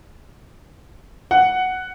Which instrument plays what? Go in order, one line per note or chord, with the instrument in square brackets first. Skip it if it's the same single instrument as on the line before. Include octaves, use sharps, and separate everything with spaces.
[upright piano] F#5